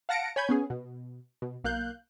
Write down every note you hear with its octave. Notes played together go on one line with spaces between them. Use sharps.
F5 F#5 A5 A#6 C#7 D7
C#5 G#5 B5 G6 G#6
B3 C#4 G#4
B2
B2
B1 A#3 F5 F#6 G6